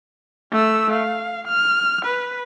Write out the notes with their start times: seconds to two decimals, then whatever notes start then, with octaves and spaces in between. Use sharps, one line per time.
0.52 A3 E6
0.93 F5
1.48 F6
2.05 B4